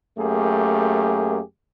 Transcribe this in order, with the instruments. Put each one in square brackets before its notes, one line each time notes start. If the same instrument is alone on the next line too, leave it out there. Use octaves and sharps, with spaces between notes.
[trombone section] F#2 A3 A#3 G4 G#4